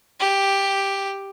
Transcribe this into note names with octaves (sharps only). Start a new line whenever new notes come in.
G4